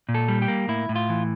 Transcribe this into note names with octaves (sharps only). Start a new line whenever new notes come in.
A#2
A4
G3
G4
A#3
A2 E4
A2
F4
E3